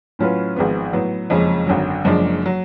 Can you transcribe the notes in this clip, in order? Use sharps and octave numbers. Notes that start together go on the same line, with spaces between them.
A2 F#3 C#4 F4 B4
G#1 G#2 F3 B3
A2 F#3 B3
F#1 F2 F3 G#3 C#4
G#1 F#2 D3 F#3
F#1 F#2 F3 G#3 D4
F#3